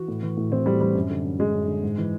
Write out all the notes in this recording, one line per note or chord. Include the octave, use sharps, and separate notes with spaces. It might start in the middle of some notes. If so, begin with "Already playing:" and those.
Already playing: E3 F#4
A2
E3
A2
E3 C4
A2 G3
E3 G3
F#2
D3
F#2
D3 G#3
F#2
D3
G#2
E3